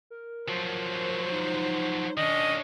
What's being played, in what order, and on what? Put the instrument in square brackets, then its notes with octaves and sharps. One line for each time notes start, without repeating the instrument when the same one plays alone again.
[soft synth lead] A#4
[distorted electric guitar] F3 F#3 [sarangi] C5
[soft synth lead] D#4
[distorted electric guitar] D#3 C#4 [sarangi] D4 [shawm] D#5